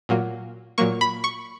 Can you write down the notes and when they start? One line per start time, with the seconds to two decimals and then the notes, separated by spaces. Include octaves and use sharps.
0.09 A#2 F#3 A#3
0.78 A#2 F#3 A#3 C#6
1.01 B5
1.24 C#6